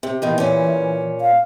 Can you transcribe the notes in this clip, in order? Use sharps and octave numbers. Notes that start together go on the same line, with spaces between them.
C3
B2 D#3 E3 F4
A#2 C#4
F5